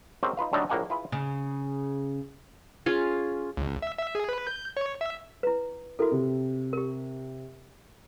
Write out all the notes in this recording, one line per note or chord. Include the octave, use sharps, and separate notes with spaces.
G#3 C4 C#4 F#4 G4 A#4
D#4 F4 B4 F5
D3 F#3 G3 A3 D4 D#4
A#1 A2 A#3 F#5 G#5
E4 F4 G#4 B4
C#3
C#4 F4 G#4
C#2
E5
E5
G#4
B4
G6
C#5
E5
E4 B4
E4 F#4 A4 A#4
C3
G4 A#4